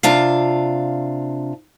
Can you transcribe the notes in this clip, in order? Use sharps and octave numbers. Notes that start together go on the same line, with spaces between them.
C3 D4 F4 F5